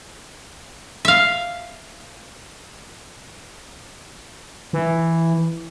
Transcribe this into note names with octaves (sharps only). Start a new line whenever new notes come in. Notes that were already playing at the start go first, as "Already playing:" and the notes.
E5 F5
E3